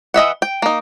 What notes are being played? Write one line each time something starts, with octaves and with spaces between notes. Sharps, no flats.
E3 D#5 E5 F#5
G5
A#3 D#4